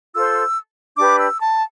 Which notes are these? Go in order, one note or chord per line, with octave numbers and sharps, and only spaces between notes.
F4 A4 C5 E6
D4 G4 B4 D6
E6
A5